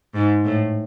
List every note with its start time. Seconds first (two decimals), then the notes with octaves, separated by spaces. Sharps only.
0.14 G#2
0.44 A2